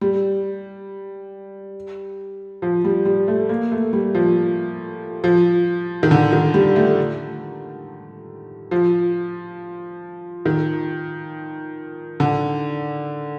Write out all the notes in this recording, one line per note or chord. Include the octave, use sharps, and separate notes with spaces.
G3
F3
G3
G3
A3
A#3
A3
G3
F3
F3
D#3
D3
D#3
G3
A3
F3
D#3
D3